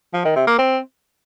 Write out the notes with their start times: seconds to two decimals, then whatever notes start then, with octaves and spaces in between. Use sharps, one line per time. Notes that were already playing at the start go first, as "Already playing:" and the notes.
0.14 F3
0.25 D#3
0.36 C3
0.47 A#3
0.58 C4